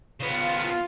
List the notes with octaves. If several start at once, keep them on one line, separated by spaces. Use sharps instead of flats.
C#3 B3 F4